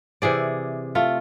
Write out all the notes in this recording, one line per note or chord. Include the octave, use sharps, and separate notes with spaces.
C3 E3 G#4 D5
A3 F4